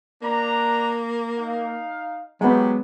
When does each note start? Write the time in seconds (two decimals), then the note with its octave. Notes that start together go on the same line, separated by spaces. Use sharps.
0.22 A#3 D4 A#5
1.37 D#4 F5
2.41 F#3 G#3 A3 B3 G4